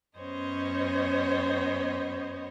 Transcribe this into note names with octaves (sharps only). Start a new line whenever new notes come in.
F#2 B3 C#4 C5 C#5 D#5